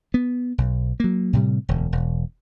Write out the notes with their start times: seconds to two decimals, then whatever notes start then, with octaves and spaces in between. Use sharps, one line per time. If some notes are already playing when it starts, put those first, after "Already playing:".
0.14 B3
0.58 B1
1.00 F#3 A#3
1.33 A2 C3 G3
1.69 E1 D2
1.92 E1